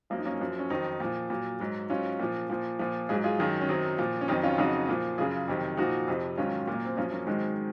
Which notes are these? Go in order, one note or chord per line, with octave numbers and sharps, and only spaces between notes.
F#2 F3 A#3
D#4
A#3 C#4
F#2 F3
C#4
F2 D#3 F#3 C4 D#4
A#2 F3
A#2 F#3
G#2 F#3
G#2 F#3 C#4 F4
A#2 F3
A#2 F3
A#2 F3
G#2 F#3 F4 G#4
F4 G#4
F#2 D#3 F#3 F4 G#4
C#4
F#2 D#3 F#3 C4 D#4
A#2 F3
C#4
F2 D#3 F#3 C4 D#4
C#4 F4
F2 C#3 F#3 D#4 F#4
A#2 F3
F#2 C#3 F#3 F4 G#4
F2 C3 D#3 F#3
A#2 F3 D#4 F#4
F2 C3 F3
G#2 D#3 F#3 C#4 F4
A#2 F#3
A#3
C4
F#2 F3 A#3 C#4
A#3 C#4
G#2 D#3 F#3 G#3 C4